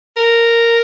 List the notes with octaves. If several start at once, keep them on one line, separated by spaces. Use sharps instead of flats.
A#4